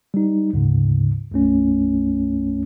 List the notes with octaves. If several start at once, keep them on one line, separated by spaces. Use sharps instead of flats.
G3 D#4
D2 G#2 C#3
B1 F#2 A3 C#4